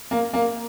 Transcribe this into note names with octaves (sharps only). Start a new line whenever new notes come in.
A#3
A#3